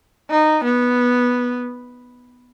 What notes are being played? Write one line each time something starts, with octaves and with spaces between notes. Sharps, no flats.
D#4
B3